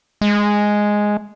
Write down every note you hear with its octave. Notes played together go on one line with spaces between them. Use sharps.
G#3